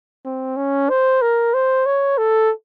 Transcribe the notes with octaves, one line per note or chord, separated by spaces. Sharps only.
C4
C#4
C5
A#4
C5
C#5
A4